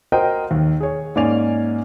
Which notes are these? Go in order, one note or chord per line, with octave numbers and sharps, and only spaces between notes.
F#4 A#4 C5 D#5 G5
D#2
G#4 C#5
G#2 A#3 C#4 D5 G#5 F7